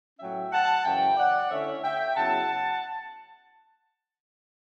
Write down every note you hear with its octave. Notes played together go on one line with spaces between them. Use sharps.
A2 F#3 C#4 E5 G5
F#5 A5
F#2 C#3 E3 E5 G5
D5 F#5
D3 A3 C#4 E4 C#5 E5
E5 G5
C#3 F#3 B3 E4 F#5 A5